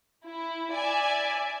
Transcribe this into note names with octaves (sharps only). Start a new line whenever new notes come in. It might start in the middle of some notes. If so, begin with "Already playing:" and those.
E4
D5 E5 G#5